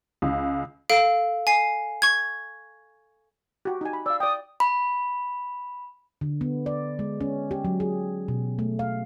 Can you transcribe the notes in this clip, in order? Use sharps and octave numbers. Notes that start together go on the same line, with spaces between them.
C#2
A4 F5 D7
G#5 C7
C#6 G#6
F#4 G4
D#4 G4 G#5
B5
D5 F5 E6
D5 G5 D#6
B5
D3
B3
D5
G#3
C#4
G4
F#3
G#4
B2
A3
F5